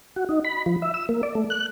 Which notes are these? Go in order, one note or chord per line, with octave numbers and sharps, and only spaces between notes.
F#4
D#4
B5
F3
E5
E6
A#3
D5
A3
F#6